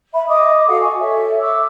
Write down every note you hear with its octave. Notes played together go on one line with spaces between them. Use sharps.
E5 B5
D#5 D6 D#6
F#4 A4 F5 F#5
G#5 C#6
A4 C#5 E5
C#6 D6 E6